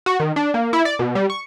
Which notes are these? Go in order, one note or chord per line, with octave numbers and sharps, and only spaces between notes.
F#4
D#3
D4
A#3
E4
D5
B2
G3
C#6